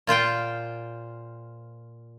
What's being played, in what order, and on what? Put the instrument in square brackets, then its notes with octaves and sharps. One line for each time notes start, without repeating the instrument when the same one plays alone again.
[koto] A#2 F4 C5 G5